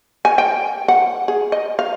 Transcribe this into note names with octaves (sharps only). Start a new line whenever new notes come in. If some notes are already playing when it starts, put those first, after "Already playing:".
G#5
G5
F#5
G#4
D#5
F5